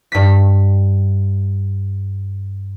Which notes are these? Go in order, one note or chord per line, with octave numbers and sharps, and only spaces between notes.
G2 B6